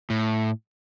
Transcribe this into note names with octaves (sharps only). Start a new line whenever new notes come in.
A2